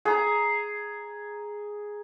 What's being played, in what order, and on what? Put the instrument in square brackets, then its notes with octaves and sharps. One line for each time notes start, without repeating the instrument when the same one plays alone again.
[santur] G#4 A#5